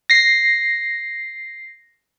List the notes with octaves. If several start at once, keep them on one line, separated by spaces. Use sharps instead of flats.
A#6 C7